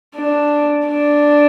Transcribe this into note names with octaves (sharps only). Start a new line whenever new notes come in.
D4
D4